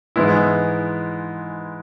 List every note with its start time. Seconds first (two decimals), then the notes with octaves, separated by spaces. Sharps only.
0.16 G#2 E3 G#3 B3 E4